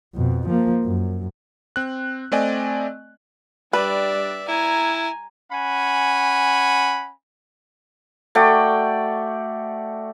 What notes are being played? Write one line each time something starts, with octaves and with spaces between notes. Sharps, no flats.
F2 B2
F3 A#3
F#2
C4 F#6
A3 C4 D5 D#5 G#5
G3 D4 B4 D5 E5
E4 G#5 A#5
C#4 F#5 G#5 B5
A3 F#4 D5 G5